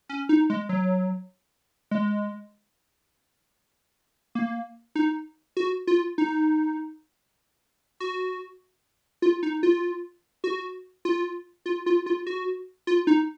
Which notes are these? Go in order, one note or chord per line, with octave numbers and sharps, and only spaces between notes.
C#4
D#4
G#3
F#3
G#3
A#3
D#4
F#4
F4
D#4
F#4
F4
D#4
F4
F#4
F4
F4
F4
F4
F#4
F4
D#4